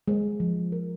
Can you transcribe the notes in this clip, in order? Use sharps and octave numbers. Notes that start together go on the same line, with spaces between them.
G#3
F3
A#4